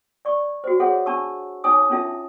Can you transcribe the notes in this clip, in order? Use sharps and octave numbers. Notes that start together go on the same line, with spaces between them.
D5 C#6
F#4 C5
G#4 A4 C#5 E5 F#5
D4 A5 C#6 E6
D#4 C#5 G#5 D6 D#6
C#4 D4 F4 A4 E5 A5